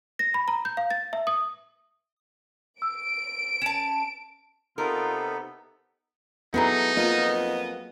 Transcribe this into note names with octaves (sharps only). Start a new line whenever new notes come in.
A#6
B5
A#5
G6
F5
A6
E5
D#6
E6 D7
C#4 A5 E7
C3 B3 D#4 F4 A4 A#4
F#3 B3 D#4 E4 G#4 A4
F2 A#3 B3 F4 D#5